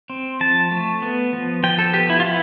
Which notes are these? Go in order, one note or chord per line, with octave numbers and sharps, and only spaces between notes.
C4
F3 A5
A3
B3
F3
F3 G5
A4
B3 G4
E4
F4
B3 E4